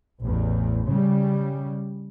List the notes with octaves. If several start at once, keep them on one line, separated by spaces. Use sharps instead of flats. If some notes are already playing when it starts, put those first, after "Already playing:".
A1 E2
C#3 G3